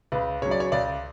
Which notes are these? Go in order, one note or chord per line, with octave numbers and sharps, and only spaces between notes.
C#2 B4
C#3 F#3 C#5
D5
C#5
C#2 D5